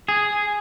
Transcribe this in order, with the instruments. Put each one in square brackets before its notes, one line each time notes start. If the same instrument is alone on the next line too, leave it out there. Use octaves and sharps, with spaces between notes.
[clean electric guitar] G#4